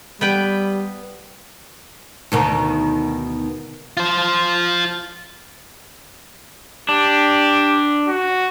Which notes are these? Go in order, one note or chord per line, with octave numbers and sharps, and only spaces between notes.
G3 B3 B4 G5
D2 B2 D#3
F4 C5
D4 G4
F#4